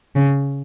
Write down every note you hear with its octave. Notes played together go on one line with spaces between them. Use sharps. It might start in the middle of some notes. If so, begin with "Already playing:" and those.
C#3